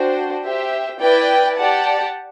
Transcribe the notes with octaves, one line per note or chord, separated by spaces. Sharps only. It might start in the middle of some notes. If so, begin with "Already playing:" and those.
Already playing: D4 F#4 C5 G5
G4 C5 E5 G5
E4 B4 D5 G5
G4 D5 F#5 A5